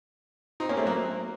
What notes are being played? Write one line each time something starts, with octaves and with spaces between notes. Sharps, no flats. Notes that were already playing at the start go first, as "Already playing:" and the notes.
C4 D#4
A#3 C#4
A3 C4
F#3 A#3